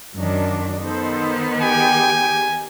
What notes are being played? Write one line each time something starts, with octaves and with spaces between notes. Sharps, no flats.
F#2 D#3 D4 F#4
D#3 B3 D#4 A4 C5
G4 G#4 G5 G#5